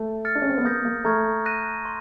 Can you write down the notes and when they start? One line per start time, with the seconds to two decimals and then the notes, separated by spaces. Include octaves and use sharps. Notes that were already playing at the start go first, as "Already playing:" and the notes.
Already playing: A3
0.25 F6 A6 C#7
0.35 D4
0.42 C#4
0.49 C4
0.58 B3
0.64 A#3 D#6 G6 A#6
0.85 A#3
1.04 A3 A#5 C#6 F6 G#6
1.46 F#6 A#6 D#7
1.85 C6